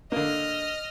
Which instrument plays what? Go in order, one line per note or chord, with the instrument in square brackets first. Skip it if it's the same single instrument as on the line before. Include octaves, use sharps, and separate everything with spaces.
[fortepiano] D3 A#3 [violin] D#5 F6